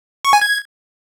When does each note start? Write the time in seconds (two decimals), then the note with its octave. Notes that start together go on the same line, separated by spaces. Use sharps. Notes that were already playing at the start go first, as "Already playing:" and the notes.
0.25 C#6
0.33 G#5
0.41 G#6